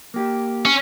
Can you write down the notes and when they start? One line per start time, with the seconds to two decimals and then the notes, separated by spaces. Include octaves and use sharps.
0.14 A#3 G4
0.65 C#4